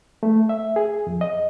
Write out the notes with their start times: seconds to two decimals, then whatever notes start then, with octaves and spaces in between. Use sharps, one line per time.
0.23 A3
0.49 E5
0.76 G#4
1.07 F2
1.21 D#5